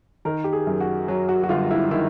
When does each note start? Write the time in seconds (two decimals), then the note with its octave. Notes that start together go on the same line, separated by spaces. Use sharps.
0.25 D#3 A#4
0.44 G4
0.53 G#4
0.67 F#2
0.81 F#4
1.08 F#3
1.29 F#4
1.43 F#4
1.49 G1 F4
1.71 E4
1.91 D#3 E4